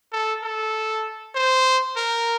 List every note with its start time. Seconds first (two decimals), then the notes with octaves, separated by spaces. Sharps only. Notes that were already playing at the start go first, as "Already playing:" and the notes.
0.12 A4
0.43 A4
1.35 C5
1.96 A#4